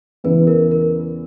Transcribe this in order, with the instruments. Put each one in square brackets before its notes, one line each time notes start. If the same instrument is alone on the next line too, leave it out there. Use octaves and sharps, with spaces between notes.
[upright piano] E2 C#3 E3 [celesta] B4
[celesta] A#4
A#4